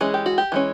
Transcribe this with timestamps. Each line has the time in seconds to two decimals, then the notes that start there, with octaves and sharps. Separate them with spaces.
0.01 E3 G#3 C#4 G#4
0.14 G4
0.26 F#4
0.38 G4
0.52 E3 G#3 C#4